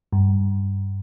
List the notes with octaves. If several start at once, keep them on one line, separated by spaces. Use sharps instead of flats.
G2